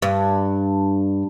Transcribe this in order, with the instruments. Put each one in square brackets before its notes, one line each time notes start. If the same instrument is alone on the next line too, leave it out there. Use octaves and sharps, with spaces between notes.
[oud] G2